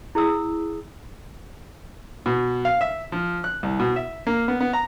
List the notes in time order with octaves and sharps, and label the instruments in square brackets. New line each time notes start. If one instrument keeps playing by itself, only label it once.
[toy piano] E4 G#4 D#6 E6
[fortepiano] B2
F5
E5
F3
F#6
C2
B2
E5
A#3
B3
B3
A#5